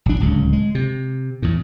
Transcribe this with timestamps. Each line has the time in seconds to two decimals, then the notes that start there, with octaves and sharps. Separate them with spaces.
0.06 A1 D4
0.20 D1 C#2 C#3
0.53 G#3
0.75 C3
1.42 E2 A2